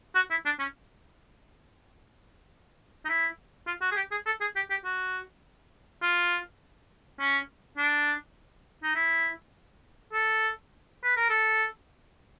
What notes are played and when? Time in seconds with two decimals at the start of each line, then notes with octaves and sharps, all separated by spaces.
0.15 F#4
0.30 E4
0.45 D4
0.59 C#4
3.05 D#4
3.09 E4
3.67 F4
3.82 F#4
3.91 G#4
3.96 G4
4.11 G#4
4.26 A4
4.41 G#4
4.56 G4
4.70 G4
4.84 F#4
6.02 F4
7.20 C#4
7.77 D4
8.83 D#4
8.95 E4
10.13 A4
11.03 B4
11.16 A#4
11.29 A4